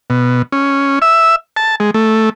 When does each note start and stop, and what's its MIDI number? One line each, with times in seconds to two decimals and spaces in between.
0.10 0.42 47
0.52 0.99 61
1.02 1.36 76
1.57 1.76 81
1.80 1.91 56
1.94 2.29 57